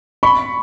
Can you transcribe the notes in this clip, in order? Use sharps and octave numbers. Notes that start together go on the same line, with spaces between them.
B5 C#6